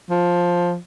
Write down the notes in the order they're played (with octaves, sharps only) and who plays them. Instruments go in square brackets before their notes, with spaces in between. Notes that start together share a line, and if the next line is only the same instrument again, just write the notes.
[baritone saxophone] F3